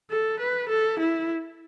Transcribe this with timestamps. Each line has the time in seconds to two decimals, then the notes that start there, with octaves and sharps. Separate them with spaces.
0.10 A4
0.39 B4
0.69 A4
0.99 E4